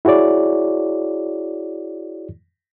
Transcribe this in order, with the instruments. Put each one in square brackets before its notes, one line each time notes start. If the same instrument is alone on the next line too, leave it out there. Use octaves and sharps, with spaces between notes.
[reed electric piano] E4 F#4 G#4 C#5 D5